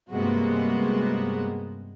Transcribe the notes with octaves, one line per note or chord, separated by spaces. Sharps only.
G2 C3 G#3 A#3 B3 F#4